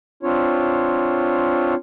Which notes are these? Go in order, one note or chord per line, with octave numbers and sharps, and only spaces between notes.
C4 D4 F4 C#5